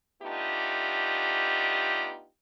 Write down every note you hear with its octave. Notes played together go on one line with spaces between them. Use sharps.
A3 B3 D4 D#4 F4 G4